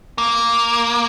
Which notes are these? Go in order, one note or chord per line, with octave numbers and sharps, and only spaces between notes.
A#3